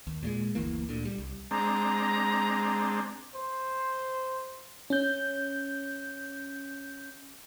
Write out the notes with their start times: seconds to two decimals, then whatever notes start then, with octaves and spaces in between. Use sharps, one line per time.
0.07 D#2
0.23 A#2 F#3 G#3
0.55 F#1 D2 E3 A#3
0.89 D2 A#2 D3
1.05 G3
1.18 C2
1.51 G#3 C4 D4 A#5
3.35 C5
4.90 C#4 G6